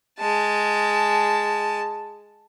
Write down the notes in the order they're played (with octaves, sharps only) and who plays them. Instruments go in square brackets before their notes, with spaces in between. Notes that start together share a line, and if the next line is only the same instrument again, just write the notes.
[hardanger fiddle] G#3 A5